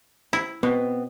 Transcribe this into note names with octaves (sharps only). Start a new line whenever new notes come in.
E4
B2 B3 C4